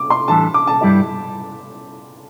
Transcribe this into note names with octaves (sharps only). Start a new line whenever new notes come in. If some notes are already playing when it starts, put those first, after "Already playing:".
Already playing: D6
C6
A2 E3 G3 D4 A4 A5
D6
A5
G2 G3 E4 G4 D5